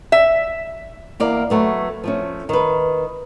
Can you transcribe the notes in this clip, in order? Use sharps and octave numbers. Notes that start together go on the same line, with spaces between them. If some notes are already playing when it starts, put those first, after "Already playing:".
E5
E2 A#3 D5
F#3 A3 B3
F3 A3 C#4
D#3 B4